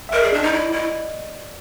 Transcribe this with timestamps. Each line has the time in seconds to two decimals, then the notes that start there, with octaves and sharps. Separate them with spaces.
0.09 E5
0.13 A#4 D#5
0.22 G#4 D5
0.33 D4
0.40 D#4 D#5
0.52 E4 D5
0.72 E4 D#5